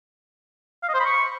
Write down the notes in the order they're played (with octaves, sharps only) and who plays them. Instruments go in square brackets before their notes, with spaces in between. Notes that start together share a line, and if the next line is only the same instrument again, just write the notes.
[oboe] F5
D#5
C5
B5
C#6